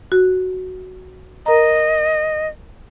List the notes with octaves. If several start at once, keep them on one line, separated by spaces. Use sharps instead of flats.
F#4
A#4 D#5 A#5